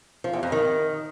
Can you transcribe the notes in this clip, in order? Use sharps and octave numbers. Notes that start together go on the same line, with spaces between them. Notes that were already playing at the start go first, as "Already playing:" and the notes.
F3
E2
F2
D#3